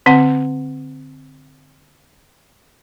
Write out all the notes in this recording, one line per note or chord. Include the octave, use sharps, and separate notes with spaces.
D3 C4 F#5